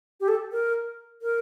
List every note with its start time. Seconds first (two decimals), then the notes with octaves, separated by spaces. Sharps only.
0.20 G4
0.28 A4
0.52 A#4
1.22 A#4